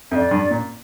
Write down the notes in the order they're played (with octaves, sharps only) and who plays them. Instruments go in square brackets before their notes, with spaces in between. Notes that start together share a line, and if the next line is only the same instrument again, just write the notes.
[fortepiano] F2 [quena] E5
[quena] D5
[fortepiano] G2
A#2